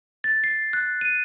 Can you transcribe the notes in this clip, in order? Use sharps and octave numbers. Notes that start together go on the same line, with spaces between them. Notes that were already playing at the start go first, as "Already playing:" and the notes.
A6
C7
F#6
D#7